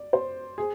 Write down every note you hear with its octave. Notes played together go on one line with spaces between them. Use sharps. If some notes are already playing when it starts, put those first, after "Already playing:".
Already playing: D5
C5
G#4